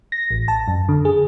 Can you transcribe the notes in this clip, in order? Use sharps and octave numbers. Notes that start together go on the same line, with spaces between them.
A#6
A1
A5
F#2
D3
G#4